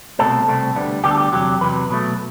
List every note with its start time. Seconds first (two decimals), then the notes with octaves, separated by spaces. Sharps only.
0.19 C2 B2 A3 C4 A4
0.47 C2 B2 A3 C4
0.75 D2 D3 G3 B3
1.04 D2 D3 G3 B3 G4
1.11 A4
1.18 G4
1.32 E2 C3 F#3 G4
1.61 E2 C3 F#3 B4
1.90 B2 F#3 A3